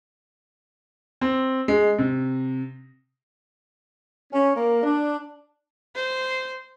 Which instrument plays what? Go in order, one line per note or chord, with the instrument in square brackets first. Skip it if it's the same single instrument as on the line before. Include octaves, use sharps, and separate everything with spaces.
[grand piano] C4
G#3
C3
[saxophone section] C#4
A#3
D4
[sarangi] C5